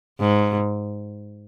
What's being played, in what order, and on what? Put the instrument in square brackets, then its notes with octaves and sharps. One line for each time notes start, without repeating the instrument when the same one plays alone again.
[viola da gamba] G#2